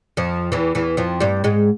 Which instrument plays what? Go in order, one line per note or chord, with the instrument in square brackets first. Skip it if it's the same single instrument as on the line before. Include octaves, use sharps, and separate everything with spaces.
[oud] F2 F3
E2 E3
E2 E3
F2 F3
G2 G3
G#2 G#3